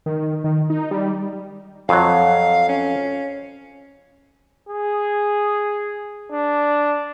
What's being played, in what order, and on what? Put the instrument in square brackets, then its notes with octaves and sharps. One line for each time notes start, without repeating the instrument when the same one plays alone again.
[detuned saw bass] D#3
D#3
D#4
G3
[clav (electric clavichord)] F2 F#3 [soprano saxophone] F5
[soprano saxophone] C#4
[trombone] G#4
D4